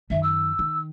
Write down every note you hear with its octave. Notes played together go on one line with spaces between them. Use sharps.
F#2 D#3 E5
E6
D#3